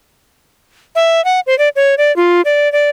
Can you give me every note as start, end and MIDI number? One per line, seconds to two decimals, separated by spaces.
0.95 1.24 76
1.25 1.40 78
1.47 1.57 72
1.58 1.69 74
1.76 1.95 73
1.98 2.14 74
2.16 2.41 65
2.45 2.71 74
2.72 2.90 74